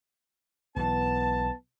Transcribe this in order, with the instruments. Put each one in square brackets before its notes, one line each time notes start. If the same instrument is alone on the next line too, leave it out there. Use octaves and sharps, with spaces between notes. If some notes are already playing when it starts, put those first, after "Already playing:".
[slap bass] B1 B2 E3 [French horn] B3 [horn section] A5